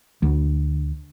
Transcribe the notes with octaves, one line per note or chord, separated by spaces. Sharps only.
D2